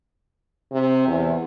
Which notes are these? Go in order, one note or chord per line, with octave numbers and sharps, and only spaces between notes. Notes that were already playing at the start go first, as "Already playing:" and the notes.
C3
E2